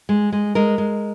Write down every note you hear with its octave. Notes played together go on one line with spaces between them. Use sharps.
G#3
G#3
G#3 A#4
G#3